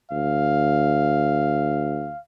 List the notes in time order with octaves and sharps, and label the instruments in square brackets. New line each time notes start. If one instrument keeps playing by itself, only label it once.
[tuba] D2 [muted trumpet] F5